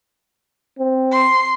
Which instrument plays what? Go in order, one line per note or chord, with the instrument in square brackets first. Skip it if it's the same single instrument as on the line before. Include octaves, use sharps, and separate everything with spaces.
[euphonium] C4
[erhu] C6